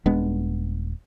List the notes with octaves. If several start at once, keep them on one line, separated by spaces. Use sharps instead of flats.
D#1 G#3 B3 D4